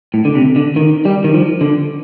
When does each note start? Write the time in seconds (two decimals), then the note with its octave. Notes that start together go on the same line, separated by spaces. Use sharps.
0.14 A2
0.25 D3
0.35 C3
0.56 D3
0.76 D#3
1.05 G3
1.24 D#3
1.34 F3
1.61 D3